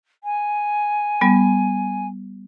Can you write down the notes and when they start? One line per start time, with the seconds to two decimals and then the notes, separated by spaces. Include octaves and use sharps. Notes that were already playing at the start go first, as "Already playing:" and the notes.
0.23 G#5
1.21 G3 B3